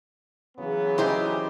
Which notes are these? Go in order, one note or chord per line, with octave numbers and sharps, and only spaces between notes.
C#3 E3 F#3 B3
C#4 D#4 E4 G4 C5